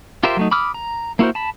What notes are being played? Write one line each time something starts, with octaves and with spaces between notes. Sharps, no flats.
F4 G4 A#4 C5 E5
F#3 A3 D#4
B5 D6 D#6 F6
A#5
A#3 E4 F#4 A#4 C5
A5 B5